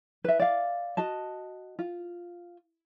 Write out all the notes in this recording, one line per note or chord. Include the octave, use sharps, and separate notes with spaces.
B4 E5
D5 F5
F#4 D#5 A5
F4